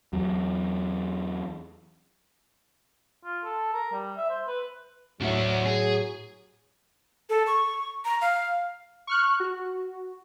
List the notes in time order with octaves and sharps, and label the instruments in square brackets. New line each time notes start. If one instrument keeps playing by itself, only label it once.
[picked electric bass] E2 F#3
[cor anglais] F4
A4
A#4
G3
E5
C5
B4
[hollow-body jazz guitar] A2 E5 [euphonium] F#3 [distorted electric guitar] D4 F#4
[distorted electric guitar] G#4
[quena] A4
C#6
A#5
F5
[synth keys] C#6 F6 F#6
F#4